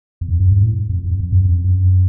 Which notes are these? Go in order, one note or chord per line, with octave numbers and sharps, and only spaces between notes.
E2
F2
F#2
G2
A2
F2
F2
F2
F#2
F2
F#2